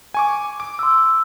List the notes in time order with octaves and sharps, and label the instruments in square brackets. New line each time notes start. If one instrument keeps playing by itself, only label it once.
[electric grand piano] G#5 C#6 D6
D6
[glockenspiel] C6 E6